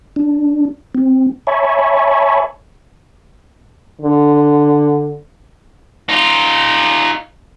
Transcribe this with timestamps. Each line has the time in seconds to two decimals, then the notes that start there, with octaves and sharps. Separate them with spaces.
0.16 D4
0.95 C4
1.47 C#5 E5 G#5 A5 B5 C#6
4.02 D3
6.09 D#4 F4